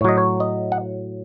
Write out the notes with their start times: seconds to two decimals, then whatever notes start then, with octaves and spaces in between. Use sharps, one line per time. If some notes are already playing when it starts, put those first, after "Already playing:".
0.01 A2 C#5
0.05 F#3 D#5
0.18 C#5
0.40 D#5
0.72 F#5